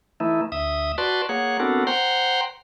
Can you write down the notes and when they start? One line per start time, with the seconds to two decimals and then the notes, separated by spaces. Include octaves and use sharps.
0.20 E3 A3 D#4 E4
0.52 D2 E5 D#6
0.98 F#4 B4 D5 A5 C6
1.29 A#3 G#4 C#5 F#5
1.60 B3 C4 D4 F#4 A4 A#4
1.87 C5 F#5 G5 A#5 C6